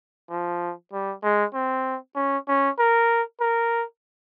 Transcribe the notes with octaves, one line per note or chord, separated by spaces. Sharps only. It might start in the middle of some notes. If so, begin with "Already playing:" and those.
F3
G3
G#3
C4
C#4
C#4
A#4
A#4